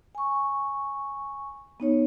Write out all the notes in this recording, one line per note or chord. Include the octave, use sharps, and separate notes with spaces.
G#5 C#6
B3 D#4 C#5